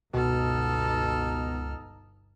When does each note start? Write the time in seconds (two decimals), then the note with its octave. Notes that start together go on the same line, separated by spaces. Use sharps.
0.13 G1 C#2 B2 D#4 A4 F6